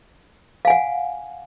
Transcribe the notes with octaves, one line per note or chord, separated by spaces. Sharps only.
F5 F#5 G#5